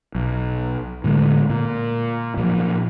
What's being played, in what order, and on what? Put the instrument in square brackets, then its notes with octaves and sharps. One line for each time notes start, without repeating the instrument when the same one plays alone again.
[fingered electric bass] B1
A2 D3 G#3 A3
A#2
A#2 F3 F#3